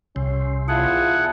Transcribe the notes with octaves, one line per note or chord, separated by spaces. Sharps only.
C2 C3 C#4
E2 E4 F4 G#4 F#5 A5